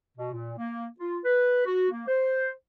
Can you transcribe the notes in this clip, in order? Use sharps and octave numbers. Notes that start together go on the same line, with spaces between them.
B2
A#2
A#3
F4
B4
F#4
A#3
C5